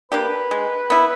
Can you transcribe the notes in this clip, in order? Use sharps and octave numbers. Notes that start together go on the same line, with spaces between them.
A#3 D4 G4 B4
G#3
B3 E4